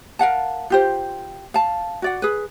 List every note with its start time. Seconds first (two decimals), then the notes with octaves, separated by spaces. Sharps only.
0.19 A#4 F5 F#5 A5
0.70 F4 G4 C5
1.54 F5 A5
2.02 F#4 D5 F#5
2.22 G#4 B4